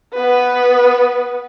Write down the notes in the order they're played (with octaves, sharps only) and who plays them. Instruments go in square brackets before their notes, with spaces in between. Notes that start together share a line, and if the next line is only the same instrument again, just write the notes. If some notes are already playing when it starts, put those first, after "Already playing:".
[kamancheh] B3 B4